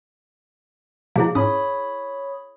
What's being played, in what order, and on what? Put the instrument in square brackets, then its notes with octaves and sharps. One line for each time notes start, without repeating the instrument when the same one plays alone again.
[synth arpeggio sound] B2 F3 [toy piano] E4 G#4 F5
[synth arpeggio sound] G#2 C#4 [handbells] C#5 B5 D#6